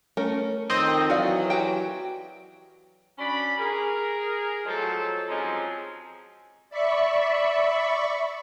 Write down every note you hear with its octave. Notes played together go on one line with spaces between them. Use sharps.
A3 C#4 A#4
F2 D#3 C4 D#5
E3 F#3 F#4 D5 F5
F#4 G4 G5
C#4 D4 F#4 D5 B5
G#4 A#4
F3 F#3 G#3 A3 A4 C5
F3 F#3 G#3 C4 C#4 D#4
D5 E5 B5 C#6